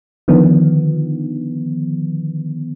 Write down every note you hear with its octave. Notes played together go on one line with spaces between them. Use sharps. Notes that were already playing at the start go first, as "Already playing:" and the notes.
D3 D#3 F3 B3